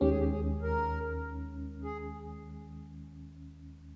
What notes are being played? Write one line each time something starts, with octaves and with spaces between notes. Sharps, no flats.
D#2 D#3 G#3 C#4 G4
G#4
G4
G#4
A#4
G#4